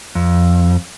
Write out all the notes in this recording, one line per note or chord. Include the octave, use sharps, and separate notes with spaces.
F2